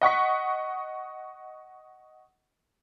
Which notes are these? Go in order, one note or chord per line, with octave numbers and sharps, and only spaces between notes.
D#5 F#5 C#6 B6